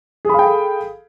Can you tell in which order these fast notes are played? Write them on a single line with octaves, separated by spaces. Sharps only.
G#4 B5 F5 G5 A4